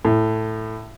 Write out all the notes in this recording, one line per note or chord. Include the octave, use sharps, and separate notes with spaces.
A2